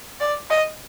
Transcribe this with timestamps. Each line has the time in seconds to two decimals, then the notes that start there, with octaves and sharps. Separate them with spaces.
0.20 D5
0.50 D#5